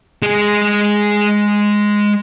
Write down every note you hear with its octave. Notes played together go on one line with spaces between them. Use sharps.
G#3 G#4